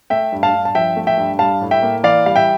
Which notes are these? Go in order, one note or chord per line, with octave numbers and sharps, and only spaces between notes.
A3 E5 G5
G2
F5 A5
G2
A5
F3 E5 G5
A3
E5 G5
G2
G3 F5 A5
A2
E5 G5
A#3
E3 D5 F5
G3 F5
E5 G5